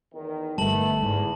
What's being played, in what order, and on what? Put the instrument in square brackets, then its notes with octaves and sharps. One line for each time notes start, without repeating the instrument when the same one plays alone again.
[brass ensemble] E2 D#3 A#4
[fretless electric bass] G1 G3 [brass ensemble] A3 B3 [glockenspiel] A5 F#7
[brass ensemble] E2 [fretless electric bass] G#2